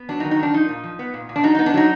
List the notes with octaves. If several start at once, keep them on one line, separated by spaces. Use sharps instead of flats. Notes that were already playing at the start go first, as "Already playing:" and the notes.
Already playing: B3
F#3 D4
D#4
D#3
D#4
D#3 D4
F3 D#4
A#2
F3
B3
A#2
A#2
D4
F#3 D#4
B3 D#4
D4
F#3 D#4